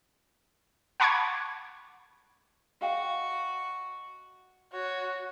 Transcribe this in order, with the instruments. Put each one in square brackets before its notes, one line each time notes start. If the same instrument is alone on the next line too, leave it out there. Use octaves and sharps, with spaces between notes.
[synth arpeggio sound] F#5 A5 B5 C#6 D6 G#6
[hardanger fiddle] F#4 [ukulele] D#5 F5 G5
[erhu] F#4 [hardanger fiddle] C#5